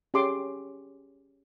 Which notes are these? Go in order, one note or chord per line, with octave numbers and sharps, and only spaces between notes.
C#4 G4 G#4 C6 D6